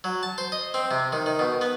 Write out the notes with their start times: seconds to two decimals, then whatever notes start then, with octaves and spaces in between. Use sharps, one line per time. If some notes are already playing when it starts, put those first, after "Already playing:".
0.04 F#3
0.23 A5
0.38 C5
0.52 D#5
0.74 C4
0.91 C3
1.13 D#3
1.26 D#3
1.39 B2
1.61 B3